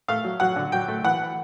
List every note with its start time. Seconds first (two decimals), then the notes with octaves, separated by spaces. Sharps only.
0.08 A3 F5
0.24 F#3
0.40 F#3 F#5
0.56 D3
0.72 F#3 G5
0.88 A3
1.04 E3 F#5